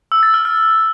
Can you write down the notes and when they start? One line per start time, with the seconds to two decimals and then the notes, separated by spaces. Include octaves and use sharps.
0.12 E6
0.23 A6
0.34 F6
0.45 F6